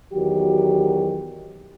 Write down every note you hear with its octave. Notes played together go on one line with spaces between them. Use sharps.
E2 D#3 F#3 F#4 G4